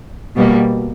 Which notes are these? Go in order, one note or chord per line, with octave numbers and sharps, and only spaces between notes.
B2 G3 A#3